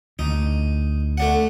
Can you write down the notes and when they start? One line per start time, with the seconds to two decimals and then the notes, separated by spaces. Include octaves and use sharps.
0.19 D2 D#4
1.18 A3 D4 F#5